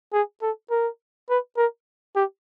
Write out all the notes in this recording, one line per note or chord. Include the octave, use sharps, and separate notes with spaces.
G#4
A4
A#4
B4
A#4
G4